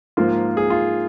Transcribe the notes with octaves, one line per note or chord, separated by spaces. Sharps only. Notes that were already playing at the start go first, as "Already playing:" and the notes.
G#2 F3 A#3 F4
G#4
F4